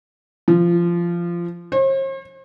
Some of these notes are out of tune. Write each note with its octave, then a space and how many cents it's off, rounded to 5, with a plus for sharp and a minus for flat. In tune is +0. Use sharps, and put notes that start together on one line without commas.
F3 -20
C5 +45